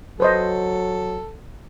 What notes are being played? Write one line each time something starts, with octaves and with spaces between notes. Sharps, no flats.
F#3 A4 B4 C5 D#5